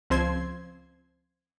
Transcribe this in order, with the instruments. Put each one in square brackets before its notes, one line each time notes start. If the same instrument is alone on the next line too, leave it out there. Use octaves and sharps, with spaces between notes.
[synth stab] C#2 F3 C4 C5 C6 G#6